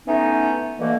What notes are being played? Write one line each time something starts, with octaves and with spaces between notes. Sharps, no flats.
E3 A3 B3 C#4 D#4
B2 D3 E3 A3 A#3